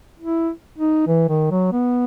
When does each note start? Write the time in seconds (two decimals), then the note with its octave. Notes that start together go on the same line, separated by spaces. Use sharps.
0.20 E4
0.78 D#4
1.07 E3
1.29 D#3
1.51 F#3
1.73 B3